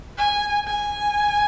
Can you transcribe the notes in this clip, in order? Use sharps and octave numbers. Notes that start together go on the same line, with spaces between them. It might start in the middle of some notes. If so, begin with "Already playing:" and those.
G#5
G#5